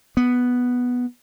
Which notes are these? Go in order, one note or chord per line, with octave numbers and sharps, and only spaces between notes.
B3